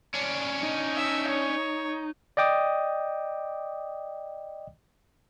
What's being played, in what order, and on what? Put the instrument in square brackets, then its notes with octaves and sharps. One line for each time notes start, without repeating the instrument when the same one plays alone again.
[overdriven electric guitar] C#4 D4
[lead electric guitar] D#4
[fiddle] E5
C#5
[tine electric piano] D5 D#5 G5 D6 D#6